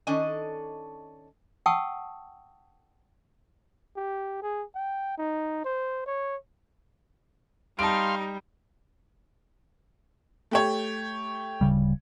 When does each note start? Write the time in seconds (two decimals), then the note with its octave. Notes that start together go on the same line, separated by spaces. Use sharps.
0.07 D#3 C#4 D4 A4 D#5 G#5
1.66 F#5 G5 A5 C#6 D#6 E6
3.96 G4
4.42 G#4
4.75 G5
5.18 D#4
5.65 C5
6.06 C#5
7.79 G3 D#4 F5 A5 C6 D7
10.51 A3 G4 C#5
11.61 D1 C#3 G3